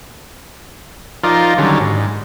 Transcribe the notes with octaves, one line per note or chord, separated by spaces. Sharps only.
F3 D#4 F4 A#4 D5
D3 D#3 F#3 G3 C#4
G#2